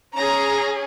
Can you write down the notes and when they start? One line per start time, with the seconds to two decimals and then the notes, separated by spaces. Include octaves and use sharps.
0.15 C#4 G#4 A#5